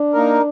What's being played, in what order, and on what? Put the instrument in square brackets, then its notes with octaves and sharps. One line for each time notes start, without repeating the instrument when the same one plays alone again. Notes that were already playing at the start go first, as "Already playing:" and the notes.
Already playing: [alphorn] D4
[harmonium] A#3 D#4 A#4